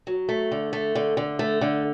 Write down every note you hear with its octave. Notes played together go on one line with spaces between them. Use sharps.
F#3
A3
D3
A3
D3
D3
A3
D3